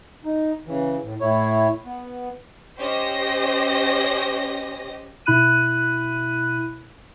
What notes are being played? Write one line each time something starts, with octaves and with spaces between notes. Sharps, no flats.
D#4
C#3 E3
A2
A2 E4 C#5
B3
C#4 G4 C5 D#5 A#6
B2 E4 B5 F#6 D#7